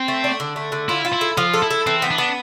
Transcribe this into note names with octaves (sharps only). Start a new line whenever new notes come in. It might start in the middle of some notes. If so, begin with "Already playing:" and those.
Already playing: C4
A3
D4
D3
A3
D3
E4 F4
F4
E4
A4
F3 F4
A4
E4
A4
E3 C4
B3
D4
B3